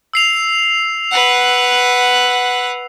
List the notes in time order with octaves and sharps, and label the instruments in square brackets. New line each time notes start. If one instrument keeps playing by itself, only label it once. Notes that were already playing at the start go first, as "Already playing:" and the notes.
[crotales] E6 C7 F7
[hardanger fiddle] B4 F#5